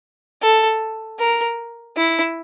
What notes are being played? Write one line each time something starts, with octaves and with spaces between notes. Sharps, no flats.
A4
A#4
E4